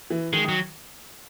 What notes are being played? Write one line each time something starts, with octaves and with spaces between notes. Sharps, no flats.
E3
D#3 G#3
D#3
F#3